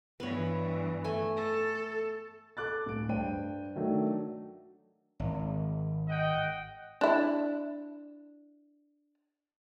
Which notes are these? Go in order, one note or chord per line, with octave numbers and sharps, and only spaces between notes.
G2 E3 B3 B4 C#5
A3 G#5
A4
A4 D6 F#6 A6
D1 D7
G2 C5 G5 D#7
D#3 F#3 A3 D4
G#1
D#5 F#5 G5
D4 E4